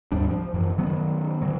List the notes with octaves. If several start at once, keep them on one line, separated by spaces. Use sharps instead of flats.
D#2 G#2 G3 D4
F3
F#2 E3
D#3 F#3 B3
D3 F#3